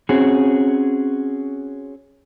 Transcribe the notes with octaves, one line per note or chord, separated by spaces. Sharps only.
C4 C#4 F#4 G#4